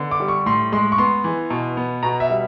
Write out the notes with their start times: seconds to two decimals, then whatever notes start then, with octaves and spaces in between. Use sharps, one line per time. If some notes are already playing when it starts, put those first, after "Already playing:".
Already playing: D3 B3
0.11 D6
0.20 G3
0.28 C#6
0.46 A2 C6
0.72 G#3 C6
0.92 C#6
0.98 B3 C6
1.24 E3
1.50 B2
1.77 B3
2.03 B2 A#5
2.20 E5
2.30 G3